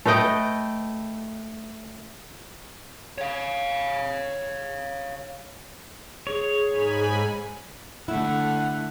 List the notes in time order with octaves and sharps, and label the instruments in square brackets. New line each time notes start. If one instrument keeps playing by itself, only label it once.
[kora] A3 B4 D#5 G5
[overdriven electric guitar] C#5 F5
[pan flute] G#4 [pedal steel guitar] C#5
[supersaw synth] G#2 G#5 B5
[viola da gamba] D3 A3 [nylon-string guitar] E4 [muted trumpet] F#5